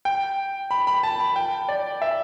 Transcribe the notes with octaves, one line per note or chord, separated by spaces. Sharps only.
G5
B5
B5
A5
B5
G5
D5
E5